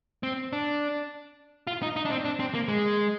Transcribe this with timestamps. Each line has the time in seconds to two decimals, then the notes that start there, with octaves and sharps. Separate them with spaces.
0.23 C4
0.53 D4
1.67 F4
1.82 D#4
1.96 D#4
2.05 D4
2.11 C4
2.25 D4
2.40 C4
2.55 A#3
2.68 G#3